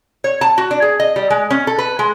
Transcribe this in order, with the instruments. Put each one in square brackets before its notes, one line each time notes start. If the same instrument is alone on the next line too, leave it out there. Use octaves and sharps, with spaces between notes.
[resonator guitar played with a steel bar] C#5
A5
F#4
D4
G#4
D#5
G3
G#3
C#4
A4
B4
G#3